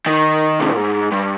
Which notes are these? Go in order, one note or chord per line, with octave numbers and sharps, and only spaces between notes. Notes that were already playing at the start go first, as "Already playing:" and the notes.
D#3
C3
A#2
G#2
G2